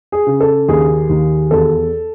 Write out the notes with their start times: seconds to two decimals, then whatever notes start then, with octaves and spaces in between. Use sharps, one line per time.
0.12 G#4
0.27 C#3
0.40 A4
0.68 D#2 G#4
1.10 D#2
1.51 E2 A4